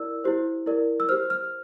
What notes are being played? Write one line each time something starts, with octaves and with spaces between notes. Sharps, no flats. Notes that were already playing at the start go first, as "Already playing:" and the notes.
Already playing: E4 A#4 D5 E6
E4 G4 C5
E4 A#4 D5
E6
G4 C5 F6
F6